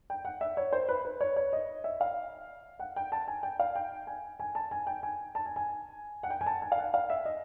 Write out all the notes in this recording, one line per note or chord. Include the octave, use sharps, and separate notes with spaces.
G5
F#5
E5
C#5
C5
B4
B4
C#5
C#5
D#5
E5
F5
F#5
G5
A5
G#5
G5
F5
G5
G#5
G#5
A5
G#5
G5
G#5
A5
G#5
G#5
F#5
G5
G#5
A5
G#5
F5
F#5
F5
E5
D#5